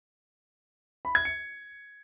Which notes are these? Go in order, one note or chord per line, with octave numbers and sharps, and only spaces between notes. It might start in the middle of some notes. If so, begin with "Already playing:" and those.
B5
G#6
C#7